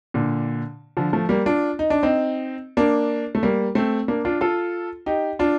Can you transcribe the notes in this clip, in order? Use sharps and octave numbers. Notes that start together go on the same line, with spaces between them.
A#2 D3
D3 F3
F3 A3
G3 A#3
D4 F4
D#4
D4
C4 D#4
A#3 D4
A3
G3 A#3
A3 C4
A#3 D4
D4 F4
F4 A4
D#4 G4
D4 F4